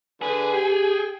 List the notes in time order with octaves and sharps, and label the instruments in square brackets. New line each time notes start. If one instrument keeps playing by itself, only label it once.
[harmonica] D3 B4 [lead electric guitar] G#4
[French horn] G4 [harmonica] G5 G#5